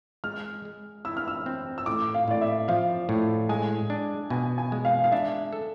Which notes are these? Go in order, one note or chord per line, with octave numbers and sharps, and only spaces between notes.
G#3 F6
G#3
E4 E6
F6
E6
C4
E6
A2 D6
F5
A2 D5
E5
F3 F5
A2
G#3 G#5
D4
B2 G#5
G#5
G#3
F5
F5
D4 E5
A4